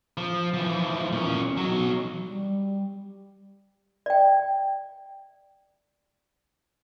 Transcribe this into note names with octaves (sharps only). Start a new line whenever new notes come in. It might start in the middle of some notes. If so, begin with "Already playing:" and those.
F3
E3 F3
A#2 C#4
B1 F#3
G3
D5 G5